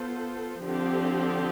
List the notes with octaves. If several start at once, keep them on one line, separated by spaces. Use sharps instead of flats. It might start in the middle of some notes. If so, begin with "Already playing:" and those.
Already playing: B3 F4 A4 C5
D3 F3 C4 G4